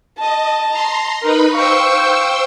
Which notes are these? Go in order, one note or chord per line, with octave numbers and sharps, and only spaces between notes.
D#5 A5
A#5 C6
D#4 A#4 B4 B5
C5 F5 G5 C#6 E6